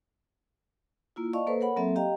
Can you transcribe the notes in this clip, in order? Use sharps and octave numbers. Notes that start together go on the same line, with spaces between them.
A#3 E4 F4
D5 D#5 F5 A5 C#6
A#3 A4 B4 C5
A#4 C#5 F#5 B5
F#3 A#3 C4 A4 E5
G4 D#5 F5 G5 A#5